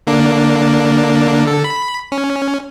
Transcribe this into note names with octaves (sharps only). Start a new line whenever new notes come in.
D3 A#3 D4
D3 A4
B5
C#4